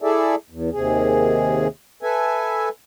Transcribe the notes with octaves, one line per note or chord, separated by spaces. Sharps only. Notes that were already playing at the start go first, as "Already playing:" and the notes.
E4 G#4 A4 D5 E5
E2
D#2 C3 G#4
A4 B4 E5 G#5